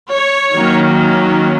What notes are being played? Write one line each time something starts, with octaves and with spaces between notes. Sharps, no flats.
C#5
D#3 F#3 A#3 C#4